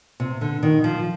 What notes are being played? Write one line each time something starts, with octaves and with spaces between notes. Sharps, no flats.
C3
D3
D#3
F3